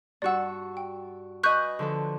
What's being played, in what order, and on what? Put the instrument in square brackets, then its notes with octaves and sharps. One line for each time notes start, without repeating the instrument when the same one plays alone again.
[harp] G2 F#4 E6 [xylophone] D5 F#5
[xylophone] G5
[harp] B4 D#5 G#5 [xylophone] C#6 F#6 G6
[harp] D3 F3 A4